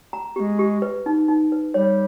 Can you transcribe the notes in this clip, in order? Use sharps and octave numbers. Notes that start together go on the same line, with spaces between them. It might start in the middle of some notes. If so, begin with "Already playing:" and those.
A#5
G#3 B3 G4
G4
B4
D#4
D#4
B4
G3 C#5